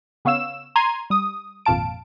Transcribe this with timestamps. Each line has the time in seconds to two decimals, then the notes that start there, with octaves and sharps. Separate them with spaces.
0.25 C#3 B3 C#5 F5 E6 E7
0.76 A#5 C6 G#6 C7 D#7
1.10 G3 D#6
1.66 G#1 F2 A#2 F5 A5 D7